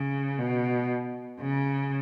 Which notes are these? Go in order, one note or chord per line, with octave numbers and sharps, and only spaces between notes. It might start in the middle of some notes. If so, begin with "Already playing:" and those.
Already playing: C#3
B2
C#3